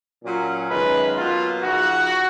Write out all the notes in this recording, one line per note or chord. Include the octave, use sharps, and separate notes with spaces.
A#2 F#3 C#4
F#2 D#3 G#3 C#4 F4 B4
B2 F#3 A#3 F4
C#3 F3 A#3 D#4 F#4